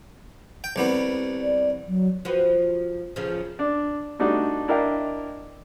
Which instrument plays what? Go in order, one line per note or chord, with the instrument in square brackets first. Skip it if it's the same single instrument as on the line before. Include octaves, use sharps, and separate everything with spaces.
[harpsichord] G5
C2 G3 B3
[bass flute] D5
F#3
[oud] F3 F#4 B4
E2 C#3 F3
[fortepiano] D4
G3 A3 D4 D#4 F#4
D4 E4 A#4 D#5 F5 G5